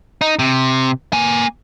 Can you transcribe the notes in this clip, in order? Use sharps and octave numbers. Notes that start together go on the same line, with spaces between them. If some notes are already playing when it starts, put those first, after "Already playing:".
D#4
C3
A#3 G#5